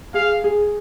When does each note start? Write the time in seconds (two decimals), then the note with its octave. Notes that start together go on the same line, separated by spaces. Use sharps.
0.14 G#4 F5
0.44 G#4